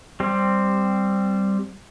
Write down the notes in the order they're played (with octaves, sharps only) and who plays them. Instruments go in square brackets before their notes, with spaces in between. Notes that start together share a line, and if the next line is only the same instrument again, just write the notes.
[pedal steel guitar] G3 C4